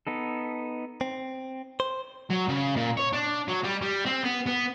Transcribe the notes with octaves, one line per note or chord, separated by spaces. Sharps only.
B3 D#4 A4
C4
C5
F#3
C#3
A#2
C#5
D4
F#3
G3
G3
C4
B3
B3